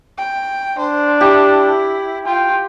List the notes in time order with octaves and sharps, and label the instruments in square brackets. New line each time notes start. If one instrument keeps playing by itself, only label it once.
[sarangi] G5
[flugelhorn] D4 [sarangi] C5
[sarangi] E4 [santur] G4
[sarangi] F4 [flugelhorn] G5